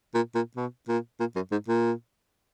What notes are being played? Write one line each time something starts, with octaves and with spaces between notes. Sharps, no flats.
A#2
A#2
B2
A#2
A#2
F#2
G#2
A#2